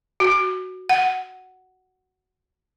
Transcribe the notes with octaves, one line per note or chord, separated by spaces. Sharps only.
F#4
F#5